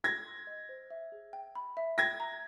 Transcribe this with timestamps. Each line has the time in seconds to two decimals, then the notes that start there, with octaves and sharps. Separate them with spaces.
0.04 G5 G#6 A#6
0.26 C6
0.47 D#5
0.69 C5
0.91 E5
1.12 G#4
1.33 G5
1.55 B5
1.77 E5
1.98 G5 G#6 A#6
2.20 A#5